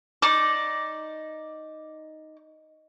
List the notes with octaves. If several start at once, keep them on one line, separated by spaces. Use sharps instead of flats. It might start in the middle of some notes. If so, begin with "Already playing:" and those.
D#4 D5